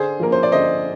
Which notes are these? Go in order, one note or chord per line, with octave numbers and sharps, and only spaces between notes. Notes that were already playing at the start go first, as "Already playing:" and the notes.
Already playing: D3 G#4 C5
F3 A#3 A#4
C5
D5
D3 C5 D#5